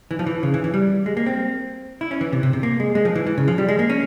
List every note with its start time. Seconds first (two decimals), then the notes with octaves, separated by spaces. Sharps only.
0.11 E3
0.19 F3
0.26 E3
0.43 C#3
0.54 E3
0.64 E3
0.74 G3
1.06 G#3
1.17 A#3
1.26 C4
2.01 E4
2.11 C#4
2.21 E3
2.33 C3
2.43 C3
2.53 C3
2.63 A#3
2.80 G#3
2.95 G#3
3.05 F3
3.15 E3
3.26 E3
3.38 C#3
3.48 F3
3.58 G3
3.69 G#3
3.79 A#3
3.90 C#4